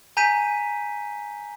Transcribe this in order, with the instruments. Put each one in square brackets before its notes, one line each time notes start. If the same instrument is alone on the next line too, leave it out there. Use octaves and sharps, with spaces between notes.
[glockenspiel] G#5 A#5 G6 B6 D#7